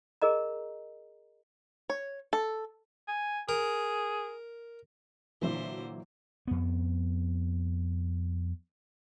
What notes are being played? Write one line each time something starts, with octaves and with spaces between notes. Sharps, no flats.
G#4 A#4 D#5 A#5
C#5
A4
G#5
G#4 A#4
A#2 D3 E3 F#3 E4 C5
F2 B3